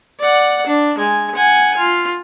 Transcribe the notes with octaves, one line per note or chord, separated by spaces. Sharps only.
D5 F#5
D4
G#3 G#5
F#5 G#5
F4